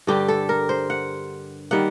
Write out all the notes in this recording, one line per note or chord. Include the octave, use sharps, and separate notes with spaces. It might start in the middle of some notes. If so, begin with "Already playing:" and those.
G2 D3 G3 G4
A4
A#4
C5
F#5
D#3 G3 A#3 F#5